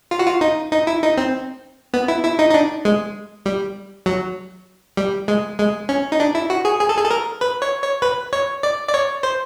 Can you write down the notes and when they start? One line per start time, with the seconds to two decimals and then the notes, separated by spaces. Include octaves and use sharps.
0.11 F4
0.19 F#4
0.26 F4
0.41 D#4
0.72 D#4
0.87 E4
1.03 D#4
1.17 C4
1.94 B3
2.08 E4
2.24 E4
2.39 D#4
2.50 D#4
2.54 D4
2.85 G#3
3.46 G3
4.06 F#3
4.97 G3
5.28 G#3
5.58 G#3
5.89 C#4
6.12 D#4
6.20 D4
6.35 E4
6.50 F#4
6.65 G#4
6.80 G#4
6.89 A4
6.97 G#4
7.05 A4
7.11 A#4
7.41 B4
7.62 C#5
7.82 C#5
8.02 B4
8.33 C#5
8.63 D5
8.88 D5
8.94 C#5
9.23 C5